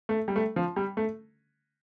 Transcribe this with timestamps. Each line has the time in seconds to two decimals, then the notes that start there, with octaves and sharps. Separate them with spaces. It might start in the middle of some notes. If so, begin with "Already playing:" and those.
0.09 A3
0.28 G3
0.36 A3
0.56 F3
0.76 G3
0.97 A3